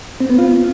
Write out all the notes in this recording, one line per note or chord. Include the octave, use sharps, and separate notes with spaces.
C4
B3
F4